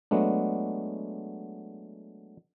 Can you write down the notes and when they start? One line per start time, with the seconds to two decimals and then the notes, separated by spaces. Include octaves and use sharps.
0.11 F#3 G#3 A3 B3 D4